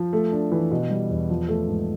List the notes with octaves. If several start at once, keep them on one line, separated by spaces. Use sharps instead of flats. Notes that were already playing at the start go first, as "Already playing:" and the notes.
Already playing: F3
A3
D4
E3
B2
G3
E2
F3
A3
G#2